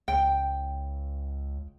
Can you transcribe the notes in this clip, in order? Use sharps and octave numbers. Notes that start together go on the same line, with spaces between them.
C#2 G5